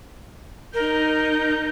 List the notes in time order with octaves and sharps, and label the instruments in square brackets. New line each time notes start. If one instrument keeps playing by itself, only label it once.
[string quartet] D#4 G6 [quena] A#4